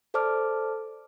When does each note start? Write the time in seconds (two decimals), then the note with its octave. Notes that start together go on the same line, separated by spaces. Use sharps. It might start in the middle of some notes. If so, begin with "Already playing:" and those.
0.14 A4 C5 D5 A5 D6 F6